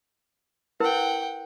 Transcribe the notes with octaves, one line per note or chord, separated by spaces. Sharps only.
E4 A#4 B4 F#5 G5